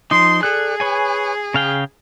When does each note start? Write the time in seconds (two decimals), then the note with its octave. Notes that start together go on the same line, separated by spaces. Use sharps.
0.11 F3 D#4 C6
0.43 G#4 A4 D5 F#6
0.80 B4 C#5 G#5
1.54 C#3 F5 G5